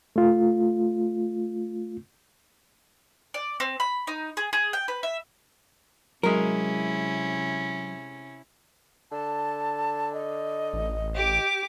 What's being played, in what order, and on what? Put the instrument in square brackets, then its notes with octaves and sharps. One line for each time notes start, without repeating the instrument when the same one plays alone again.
[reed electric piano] A3 F4
[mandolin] D5
C4
B5
D#4
G#4
G#4
G5
B4
E5
[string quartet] C3 C#4 E4 [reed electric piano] F#3 [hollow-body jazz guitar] G#3 A#4
[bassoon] D3 [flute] A5
[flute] D#5
[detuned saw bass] A1
[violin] G4 D6